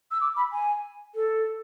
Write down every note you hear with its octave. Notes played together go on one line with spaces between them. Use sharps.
E6
D6
B5
G#5
A4